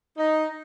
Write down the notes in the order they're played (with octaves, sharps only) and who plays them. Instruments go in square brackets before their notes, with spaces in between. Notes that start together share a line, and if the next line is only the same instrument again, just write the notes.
[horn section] D#4